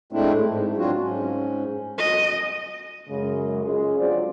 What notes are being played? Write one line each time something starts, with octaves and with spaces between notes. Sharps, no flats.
A2 G#3 A3 C4 D4 E4
G#2
F#3 C4 D4 F4 F#4
G#2 C#4
D#5
F#2 C#3 G#3
G#3 C#4 F4 G#4
D3 F#3 C4 F4 C5 D5